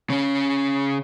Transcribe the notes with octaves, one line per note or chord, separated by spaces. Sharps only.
C#3 C#4